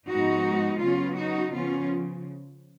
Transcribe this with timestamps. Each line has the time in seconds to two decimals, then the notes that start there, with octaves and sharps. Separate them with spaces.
0.09 G#2 F3 G#3 B3 D#4 F#4
0.80 C#3 F#3 B3 C#4 F4
1.17 D#4 F#4
1.53 C#3 F3 B3 C#4 F4